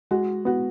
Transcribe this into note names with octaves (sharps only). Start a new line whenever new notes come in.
G#3 F#4
B3 F#4